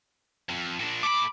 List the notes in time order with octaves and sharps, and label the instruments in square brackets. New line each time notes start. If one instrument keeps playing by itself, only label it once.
[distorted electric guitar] F2
A#2 D4
[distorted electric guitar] A3 B5 [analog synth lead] D6